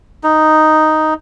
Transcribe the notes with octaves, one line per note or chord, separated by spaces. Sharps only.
D#4